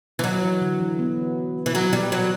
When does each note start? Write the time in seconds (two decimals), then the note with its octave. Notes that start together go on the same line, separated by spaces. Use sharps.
0.19 E3
0.24 F#3
0.43 E3
0.61 D3
0.80 E3
0.99 B3
1.66 E3
1.75 F#3
1.93 G3
2.12 F#3